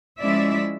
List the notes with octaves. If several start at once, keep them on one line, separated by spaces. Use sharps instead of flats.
F3 G#3 C#4 E4 D5 E5